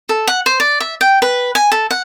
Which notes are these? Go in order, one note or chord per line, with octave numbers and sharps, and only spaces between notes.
A4
F#5
C5
D5
E5
G5
B4
G#5
A4
F#5